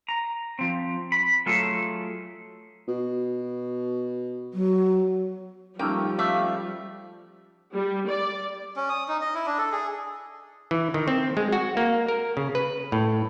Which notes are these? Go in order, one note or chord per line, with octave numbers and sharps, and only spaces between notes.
A#5
F3 C4
B5
F#3 A3 F4 G#4 A4
B2
F#3
F3 G3 A3 A#3 C#4 D#4 G5
A3 D5 E5 F5
G3
D5
C#4
D#6
D#4
D#5
E4
D4
A4
G#4
E3
D#3
C4
G#3
F#4
A#3
A#4
C#3
B4
A2